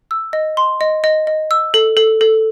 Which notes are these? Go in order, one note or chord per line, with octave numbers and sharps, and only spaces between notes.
E6
D#5
C6
D#5
D#5
D#5
E6
A4
A4
A4